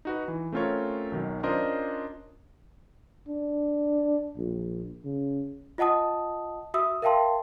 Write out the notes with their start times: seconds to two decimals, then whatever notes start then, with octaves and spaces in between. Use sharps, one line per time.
0.05 D#4 F#4 B4
0.28 E3
0.52 A3 C4 C#4 F4 A#4 C#5
1.12 B1 D#3 F#3
1.43 C#4 D4 F4 A#4 C5 D#5
3.28 D4
4.37 A#1
5.05 C#3
5.78 F4 D#5 F#5 A5 D#6
6.74 F#4 E5 D#6 E6
7.02 A#4 E5 F5 G5 A5 C6